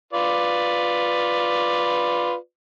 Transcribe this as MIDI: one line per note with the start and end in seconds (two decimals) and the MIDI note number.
0.13 2.35 65
0.13 2.35 71
0.13 2.35 74